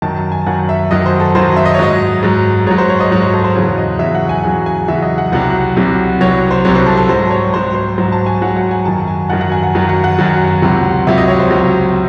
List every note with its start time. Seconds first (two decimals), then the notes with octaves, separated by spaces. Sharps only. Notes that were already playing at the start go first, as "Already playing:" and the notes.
0.02 F#2 D#3 F#3 A5
0.16 A5
0.32 G#5
0.46 F#2 D#3 F#3 F#5
0.69 E5
0.91 F#2 D#3 F#3 D#5
1.06 C5
1.20 A4
1.35 F#2 D#3 F#3 C5
1.57 E5
1.66 D#5
1.74 C#5
1.79 G#2 F#3 D#5
2.23 G#2 F#3
2.67 G#2 C#5
2.71 F#3
2.78 C5
2.89 C#5
3.00 D#5
3.11 G#2 F#3 C#5
3.23 C5
3.33 A4
3.44 C5
3.55 E2 C#3 F#3 C#5
3.78 D#5
3.99 E2 C#3 F#3 E5
4.15 F#5
4.29 G#5
4.44 E2 C#3 F#3 G#5
4.66 G#5
4.88 E2 C#3 F#3 E5
5.02 D#5
5.18 F#5
5.32 C2 C3 F#3 F#5
5.77 C2 C3 F#3
6.21 C2 C3 F#3 C#5
6.51 C5
6.65 C2 C3 F#3 C#5
6.75 C5
6.86 A4
6.97 A4
7.09 G#2 F#3 C5
7.31 C#5
7.53 G#2 F#3 C5
7.75 C5
7.98 G#2 F#3 C5
8.12 A5
8.26 G#5
8.42 G#2 F#3 F#5
8.56 F#5
8.71 G#5
8.85 F#2 D#3 F#3 A5
9.08 G#5
9.30 F#2 D#3 F#3 F#5
9.41 F#5
9.52 G#5
9.63 F#5
9.75 F#2 D#3 F#3
9.89 F#5
10.04 F#5
10.19 F#2 D#3 F#3
10.62 C#2 C3 F#3
11.07 C#2 C3 F#3 E5
11.18 D#5
11.28 C#5
11.40 C5
11.51 C#2 C3 F#3